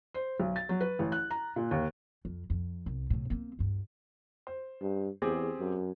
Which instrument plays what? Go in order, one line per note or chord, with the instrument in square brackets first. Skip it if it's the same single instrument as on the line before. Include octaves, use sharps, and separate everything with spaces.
[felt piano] C5
B1
A6
F#3
B4
A1
F#6
A#5
A#2
D#2
[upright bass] F2
F2
C2
A2 C3
A#3 C4
D2 G2
[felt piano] C5
[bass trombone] G2
[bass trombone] E2 [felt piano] C4 G4 G#4
[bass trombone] F#2